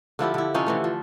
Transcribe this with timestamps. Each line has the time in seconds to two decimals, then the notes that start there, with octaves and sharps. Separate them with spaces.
0.19 D3 F3 E4 G4
0.34 D3 E4
0.54 C3 F3 C#4 D#4
0.66 D3 E3 A3
0.84 F3